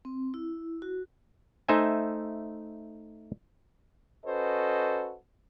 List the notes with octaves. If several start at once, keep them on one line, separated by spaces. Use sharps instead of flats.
C4
E4
F#4
A3 D#4 C5 E5 G#5
C#4 F#4 A4 B4 C5 D#5